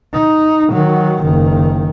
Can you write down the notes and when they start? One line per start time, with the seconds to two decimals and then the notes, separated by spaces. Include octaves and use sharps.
0.14 D#4
0.73 D#3 F#3
1.24 F#1 D#3